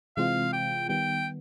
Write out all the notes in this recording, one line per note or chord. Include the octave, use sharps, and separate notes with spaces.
C3 E3 G#3 C4 F4 F5
G5
D#3 G3 B3 G5